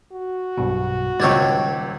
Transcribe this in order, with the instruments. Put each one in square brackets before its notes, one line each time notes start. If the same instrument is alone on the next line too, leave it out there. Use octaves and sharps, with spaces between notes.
[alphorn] F#4
[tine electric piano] B1 G2 B2
[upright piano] D#1 C#2 [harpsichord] G3 G4 C#5 [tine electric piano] E6 G#6 A6